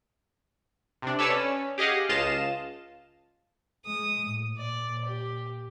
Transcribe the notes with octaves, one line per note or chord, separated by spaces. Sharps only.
C3 D4
A4 B4 C#5 D5 A5 E6
C#4
G4 G#4 D#5 F5 F#5
C#2 F4 D#5 F5 A5 E7
G#3 D#6
A2
A#2 D5
G4